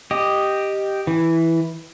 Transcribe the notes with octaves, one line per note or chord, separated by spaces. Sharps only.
G4 D#5
E3